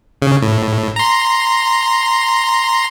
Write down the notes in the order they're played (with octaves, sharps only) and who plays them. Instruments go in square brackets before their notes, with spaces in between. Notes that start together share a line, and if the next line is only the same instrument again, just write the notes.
[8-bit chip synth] C#3
A2
A#5 C6